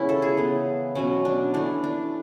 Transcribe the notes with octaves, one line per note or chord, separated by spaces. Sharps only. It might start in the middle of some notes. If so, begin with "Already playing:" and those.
Already playing: C#3 E3 G#3 B3 C#4 E4
A4
G#4
C#3 E3 B3
B2 F#3 B3 C#4
D4
E3 A3 D4
D4